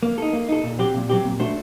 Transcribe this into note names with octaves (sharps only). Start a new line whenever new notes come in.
A#3
D#4 A4
A#3
D#4 A4
A#2
F#3 C4 G4
A#2
F#3 C4 G4
A#2
A3 D4 F#4 C5